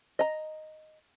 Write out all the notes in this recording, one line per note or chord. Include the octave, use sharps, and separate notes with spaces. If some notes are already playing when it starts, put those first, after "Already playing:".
D#5 A#5